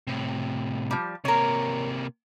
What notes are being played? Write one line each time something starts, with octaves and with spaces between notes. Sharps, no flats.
A2 C3
F3 G3
C3 A#3 A#4 C#5